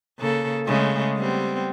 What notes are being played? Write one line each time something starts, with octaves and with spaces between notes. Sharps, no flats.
C#3 A#3 A4
C#3 G#3 A3
G3 B3 C4